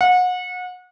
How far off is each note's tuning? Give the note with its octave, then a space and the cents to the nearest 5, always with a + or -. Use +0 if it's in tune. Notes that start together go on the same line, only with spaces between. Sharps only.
F#5 -30